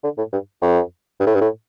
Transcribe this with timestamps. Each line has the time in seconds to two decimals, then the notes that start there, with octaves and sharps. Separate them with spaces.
0.04 D3
0.18 A2
0.33 G2
0.62 F2
1.20 G2
1.27 A2
1.35 G2
1.41 A2